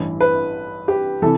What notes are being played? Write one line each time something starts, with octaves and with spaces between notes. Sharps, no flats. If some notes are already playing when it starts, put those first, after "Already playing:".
Already playing: A1 G2 E3
B4
G4
C3 E3 A4